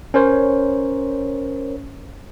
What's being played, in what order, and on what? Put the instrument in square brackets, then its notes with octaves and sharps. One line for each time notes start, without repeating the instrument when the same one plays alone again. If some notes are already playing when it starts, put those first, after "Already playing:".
[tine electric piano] C#4 A#4 C5 C#5